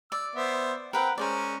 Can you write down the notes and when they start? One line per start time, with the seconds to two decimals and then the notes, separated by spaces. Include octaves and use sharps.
0.12 D5 E6
0.35 B3 C5 E5
0.93 C4 A#4 B4 F#5 G5
1.18 G#3 C#4 A#4 C5 D5